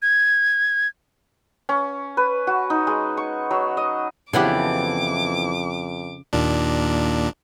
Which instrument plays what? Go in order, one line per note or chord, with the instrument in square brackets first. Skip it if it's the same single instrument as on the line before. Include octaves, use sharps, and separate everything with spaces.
[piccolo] G#6
[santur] C#4
B4
F#4
D#4
G#3
C#6
F#3
D#5
[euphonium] F2 [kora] C#3 E4 G4 [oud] E3 B3 D4 [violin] D6
[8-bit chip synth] D#2 A#2 D4